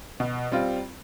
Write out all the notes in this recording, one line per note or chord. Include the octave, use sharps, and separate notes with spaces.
B2
G3 C4 F4